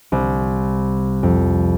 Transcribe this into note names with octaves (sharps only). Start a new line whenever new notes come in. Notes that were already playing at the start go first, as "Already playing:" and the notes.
C2
F2